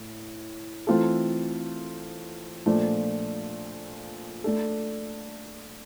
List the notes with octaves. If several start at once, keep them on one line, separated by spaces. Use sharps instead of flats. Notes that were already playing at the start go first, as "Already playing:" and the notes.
Already playing: A2
E3 A3 C4 F4 A4
A#2 F3 A3 D4
A3 D4 A4